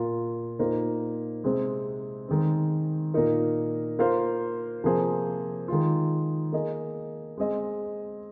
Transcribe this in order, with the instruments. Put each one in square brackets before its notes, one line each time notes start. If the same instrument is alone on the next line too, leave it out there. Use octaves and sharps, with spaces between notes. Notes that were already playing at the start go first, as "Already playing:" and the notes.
Already playing: [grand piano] A#2 A#3 F4
A#2 A#3 D#4 C5
C3 G#3 C4 G#4 C5
D#3 G#3 C4
A#2 A#3 D#4 A#4
A#3 F4 C5 F5
C3 F3 A#3 G#4 C5
D#3 G#3 F4
A#3 G#4 D#5
G#3 C4 G#4 D#5